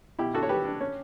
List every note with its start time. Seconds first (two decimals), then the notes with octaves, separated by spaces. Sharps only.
0.19 B2 E4 G4
0.34 D4 F#4 A4
0.43 C#5
0.49 G3 G4 B4
0.65 D4
0.81 C#4